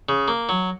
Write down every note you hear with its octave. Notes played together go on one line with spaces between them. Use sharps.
C#3
A#3
F#3